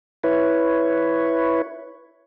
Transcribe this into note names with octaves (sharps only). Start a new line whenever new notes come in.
E4 B4 C#5